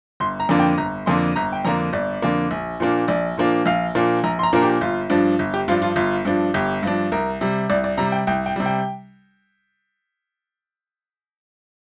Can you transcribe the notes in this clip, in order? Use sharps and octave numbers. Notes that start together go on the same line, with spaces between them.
G1 C6
A#5
F2 D3 A#3 D4
G5
G1 A#5
F2 D3 A#3 D4 C6
G1 A#5
G5
F2 D3 A#3 D4 A#5
G1 D5
F2 D3 A#3 D4
A#1
A#2 F3 A#3 D4
A#1 D5
A#2 F3 A#3 D4
A#1 F5
A#2 F3 A#3 D4
A#1 A#5
C6
A#5
A#2 F3 A#3 D4 A#4
G4
G1 F4
G2 F3 D4
G1
G4
G2 F3 D4 F4
F4
G1 F4
G2 F3 D4
G1 G4
G2 F3 D4
C2 A#4
C3 G3
C2 D5
D5
C3 G3 A#5
G5
C2 G5
G5
C3 G3
G5